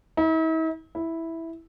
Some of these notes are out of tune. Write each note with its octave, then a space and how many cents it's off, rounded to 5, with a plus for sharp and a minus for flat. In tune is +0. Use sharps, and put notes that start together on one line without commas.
E4 -45
E4 -5